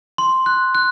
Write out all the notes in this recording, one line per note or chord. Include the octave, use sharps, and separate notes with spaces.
C6
F#6
F#6